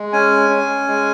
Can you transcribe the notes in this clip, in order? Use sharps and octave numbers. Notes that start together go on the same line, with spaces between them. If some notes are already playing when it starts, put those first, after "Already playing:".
Already playing: G#3
C#4 G#5
C#4
G#3